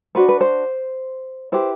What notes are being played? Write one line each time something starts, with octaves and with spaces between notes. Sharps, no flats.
D4 F#4 B4 C5
B4
C5
E4 G4 B4 C5